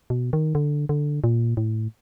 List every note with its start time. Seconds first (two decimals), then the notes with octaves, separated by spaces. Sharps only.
0.10 B2
0.33 D#3
0.55 D3
0.89 D3
1.24 A#2
1.57 A2